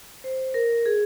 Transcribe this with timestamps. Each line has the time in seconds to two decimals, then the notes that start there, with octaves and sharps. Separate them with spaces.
0.24 C5
0.54 A#4
0.86 G#4